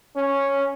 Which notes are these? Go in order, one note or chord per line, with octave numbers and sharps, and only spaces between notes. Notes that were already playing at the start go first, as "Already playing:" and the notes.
C#4